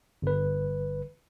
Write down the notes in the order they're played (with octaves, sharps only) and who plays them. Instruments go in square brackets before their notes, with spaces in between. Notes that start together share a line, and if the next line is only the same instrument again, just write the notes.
[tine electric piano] G1 B4